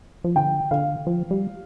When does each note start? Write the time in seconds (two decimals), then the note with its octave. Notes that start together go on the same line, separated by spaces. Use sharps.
0.24 F3
0.36 D3 G5
0.71 D3 F5
1.07 F3
1.31 G3